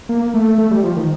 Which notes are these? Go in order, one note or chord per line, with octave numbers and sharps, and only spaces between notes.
A#3
A3
A3
G3
F3
D#3